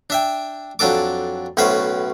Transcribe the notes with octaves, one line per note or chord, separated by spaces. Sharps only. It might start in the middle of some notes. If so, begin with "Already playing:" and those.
D4 E5 G5
F2 F#3 D4 A4 D6
B1 A2 F#3 C#4 B4 C5